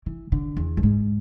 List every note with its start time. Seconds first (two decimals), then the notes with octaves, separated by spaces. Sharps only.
0.06 E3
0.32 D3
0.57 E2
0.77 F#2
0.83 G#2